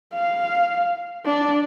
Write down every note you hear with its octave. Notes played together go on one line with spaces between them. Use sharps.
F5
D4